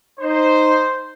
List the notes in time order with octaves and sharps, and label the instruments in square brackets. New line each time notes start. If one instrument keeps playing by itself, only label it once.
[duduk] D#4 [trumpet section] C5